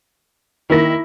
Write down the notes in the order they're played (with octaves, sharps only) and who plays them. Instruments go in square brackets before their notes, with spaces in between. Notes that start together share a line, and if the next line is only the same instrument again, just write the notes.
[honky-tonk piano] D#3 A#3 A#6 [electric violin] E4